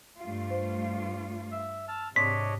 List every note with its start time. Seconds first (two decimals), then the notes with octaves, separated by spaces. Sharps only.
0.20 G2 A3 F4
0.50 C5
1.52 E5
1.88 A5 E6 F6
2.16 G#2 C3 D4 C#5 D#5 B6